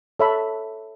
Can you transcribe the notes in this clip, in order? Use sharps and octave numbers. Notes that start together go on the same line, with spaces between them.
A4 C#5 E5 B5